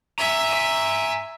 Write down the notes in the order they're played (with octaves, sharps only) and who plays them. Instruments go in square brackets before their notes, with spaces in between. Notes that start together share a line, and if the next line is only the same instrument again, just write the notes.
[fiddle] E5 [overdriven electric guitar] G#5 A#5